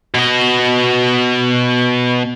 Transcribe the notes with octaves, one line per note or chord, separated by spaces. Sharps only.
B2 D#5